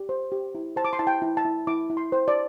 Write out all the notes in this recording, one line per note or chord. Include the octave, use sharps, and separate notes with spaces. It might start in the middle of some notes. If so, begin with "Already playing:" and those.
Already playing: G4
C5
G4
E4
C5 A5
D6
C6
E4 A5
G5
E4
A5
E4
E4 D6
E4
C6
C5
D5